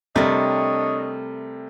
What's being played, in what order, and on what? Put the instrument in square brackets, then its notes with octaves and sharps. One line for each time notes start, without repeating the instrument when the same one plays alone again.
[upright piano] C3 G3 [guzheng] A3 A#4 [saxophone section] D4 C#5 D#5